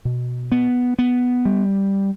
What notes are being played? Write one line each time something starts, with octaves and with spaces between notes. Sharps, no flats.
B2
B3
B3
G3